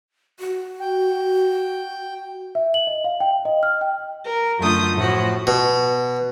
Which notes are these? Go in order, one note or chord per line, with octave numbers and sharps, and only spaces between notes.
F#4
G5
E5
F#7
D#5
F5
G5
D#5
F6
G5
A#4
F#2 D3 A3 F4 D#6 G6
A2 F3 F#4
B2